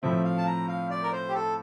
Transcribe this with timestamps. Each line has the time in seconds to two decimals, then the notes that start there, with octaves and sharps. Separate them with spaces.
0.03 A2 F3 C4 E5
0.24 F5
0.38 A5
0.46 A#5
0.68 F5
0.91 D5
1.03 A#4
1.12 C5
1.29 G4
1.34 A4